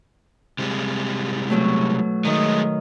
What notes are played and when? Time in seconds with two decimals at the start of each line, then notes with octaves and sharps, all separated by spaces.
0.59 C3 G3 G#3
1.50 B2 F#3 A3
2.25 D#3 G#3 A3 D#5